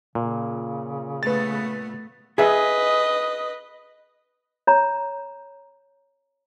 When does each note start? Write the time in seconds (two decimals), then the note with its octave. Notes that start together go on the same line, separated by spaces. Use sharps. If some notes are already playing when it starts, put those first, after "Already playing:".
0.15 A#2 C#3
1.23 A3 B3 B4 A6
2.38 G#4 B4 D#5 E5
4.67 C#5 A#5